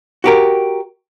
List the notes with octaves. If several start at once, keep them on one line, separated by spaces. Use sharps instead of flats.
F#4 G4 A#4